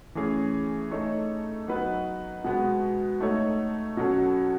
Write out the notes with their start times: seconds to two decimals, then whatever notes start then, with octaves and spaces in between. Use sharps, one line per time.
0.15 E3 A3 C#4 G#4
0.91 A3 D#4 A4 C#5
1.68 F#3 B3 D#4 F#4 B4
2.44 B2 G#3 B3 F#4
3.20 A3 D#4 A4 C#5
3.97 B2 F#3 C#4 F#4 A4